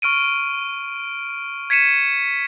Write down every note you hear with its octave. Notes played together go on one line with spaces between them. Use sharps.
C#6 F6 D7 D#7
G#6 B6 C#7 D#7 E7